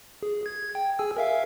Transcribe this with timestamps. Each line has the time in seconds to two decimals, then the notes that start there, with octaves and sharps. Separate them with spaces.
0.23 G#4
0.46 G#6
0.75 G5
0.99 G#4 G#5 E6
1.17 A#4 E5 F5